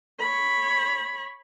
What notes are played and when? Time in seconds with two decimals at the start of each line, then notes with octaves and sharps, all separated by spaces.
0.19 C#5 B5